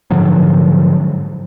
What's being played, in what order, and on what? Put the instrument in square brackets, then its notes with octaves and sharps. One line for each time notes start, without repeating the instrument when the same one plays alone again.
[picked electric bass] G#2 D3 F3 F#3